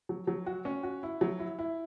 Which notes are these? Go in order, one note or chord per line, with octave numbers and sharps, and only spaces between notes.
F#3
F#3
F#4
C#4
F#4
E4
F#3
E4
E4